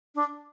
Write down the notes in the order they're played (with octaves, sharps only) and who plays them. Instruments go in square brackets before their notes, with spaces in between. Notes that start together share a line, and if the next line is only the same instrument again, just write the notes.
[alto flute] D4